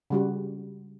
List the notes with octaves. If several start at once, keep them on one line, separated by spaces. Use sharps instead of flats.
C#3 G3 F#4